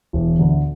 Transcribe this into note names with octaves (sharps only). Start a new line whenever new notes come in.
E1
D2 D3